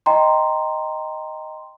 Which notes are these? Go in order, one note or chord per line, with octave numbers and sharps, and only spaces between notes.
D#5 G5 A#5 C6